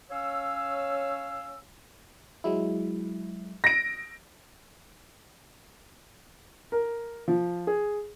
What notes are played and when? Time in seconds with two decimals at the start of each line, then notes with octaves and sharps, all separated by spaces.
0.11 C#4 C#5 F5 E6
2.44 F#3 G#3 E4
3.64 A#6 D7
6.72 A#4
7.28 F3
7.67 G#4